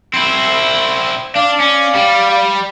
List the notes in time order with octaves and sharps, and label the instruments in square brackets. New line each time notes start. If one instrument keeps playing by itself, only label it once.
[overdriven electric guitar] C4 E4
[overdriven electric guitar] D4 [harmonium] D5 F5
[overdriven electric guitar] C#4
G3